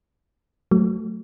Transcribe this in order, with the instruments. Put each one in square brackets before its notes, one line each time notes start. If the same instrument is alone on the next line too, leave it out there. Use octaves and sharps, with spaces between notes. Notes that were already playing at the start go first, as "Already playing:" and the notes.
[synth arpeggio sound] F#3 A3